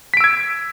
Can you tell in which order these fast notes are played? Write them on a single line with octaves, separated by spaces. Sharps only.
B6 D7 E6 G#6